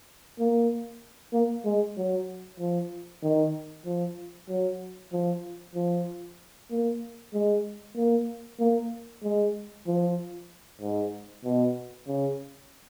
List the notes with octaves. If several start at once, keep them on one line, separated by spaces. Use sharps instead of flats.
A#3
A#3
G#3
F#3
F3
D#3
F3
F#3
F3
F3
A#3
G#3
A#3
A#3
G#3
F3
G#2
B2
C#3